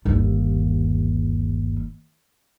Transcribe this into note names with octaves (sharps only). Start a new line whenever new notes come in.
G1 D#2